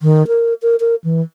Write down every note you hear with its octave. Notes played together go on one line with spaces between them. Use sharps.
D#3
A#4
A#4
A#4
E3